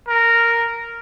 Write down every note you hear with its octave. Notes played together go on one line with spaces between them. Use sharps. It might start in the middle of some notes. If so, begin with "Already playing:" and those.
A#4